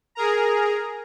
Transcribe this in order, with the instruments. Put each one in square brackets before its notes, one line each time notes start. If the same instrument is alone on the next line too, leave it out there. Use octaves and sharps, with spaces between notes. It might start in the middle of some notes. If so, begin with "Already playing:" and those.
[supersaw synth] G#4 A#4 A#5